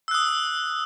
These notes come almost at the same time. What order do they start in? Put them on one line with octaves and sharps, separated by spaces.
E6 F#6 D#6